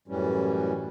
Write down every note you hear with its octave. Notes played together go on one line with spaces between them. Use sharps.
F#2 A2 E3 G3 C#4